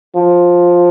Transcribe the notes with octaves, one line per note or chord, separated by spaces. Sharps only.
F3